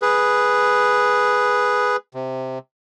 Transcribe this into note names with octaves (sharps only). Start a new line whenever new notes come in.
G#4 B4
C3